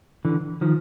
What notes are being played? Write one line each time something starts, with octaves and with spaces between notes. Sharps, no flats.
D3 E3
D#3 F3